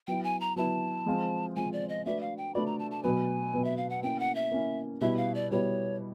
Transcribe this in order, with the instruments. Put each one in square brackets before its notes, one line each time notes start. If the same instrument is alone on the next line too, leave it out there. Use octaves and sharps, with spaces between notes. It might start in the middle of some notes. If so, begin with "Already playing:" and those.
[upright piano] F#3 B3 E4 [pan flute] G5
[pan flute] G#5
A#5
[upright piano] F#3 B3 E4 [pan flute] A5
[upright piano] F3 G#3 C4 F4
[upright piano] F3 G#3 C4 F4 [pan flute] G#5
[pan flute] D5
D#5
[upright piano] A3 D4 F#4 B4 D5 [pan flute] E5
[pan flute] F5
G5
[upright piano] A3 D4 F#4 B4 D5 [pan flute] B5
[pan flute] A#5
A5
A5
[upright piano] B2 F#3 B3 [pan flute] G#5
[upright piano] B2 F#3 B3
[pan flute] E5
F5
F#5
[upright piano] A#3 C#4 E4 [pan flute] G5
[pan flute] F#5
E5
[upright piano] A#3 C#4 E4
[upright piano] B2 G3 B3 E4 [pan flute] E5
[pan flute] F5
D5
[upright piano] B2 G3 B3 E4 [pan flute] C#5